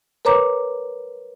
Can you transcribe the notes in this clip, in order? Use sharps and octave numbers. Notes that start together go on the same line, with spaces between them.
A#4 B4 C#5 A#5 D6